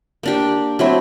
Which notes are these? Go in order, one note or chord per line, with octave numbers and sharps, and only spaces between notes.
A#3 D4 G4
F#3 A3 C4 E4